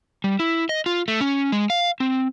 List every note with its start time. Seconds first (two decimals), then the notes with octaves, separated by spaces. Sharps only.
0.24 G3
0.40 E4
0.69 D#5
0.86 F4
1.08 A3
1.21 C#4
1.52 G#3
1.70 F5
2.00 C4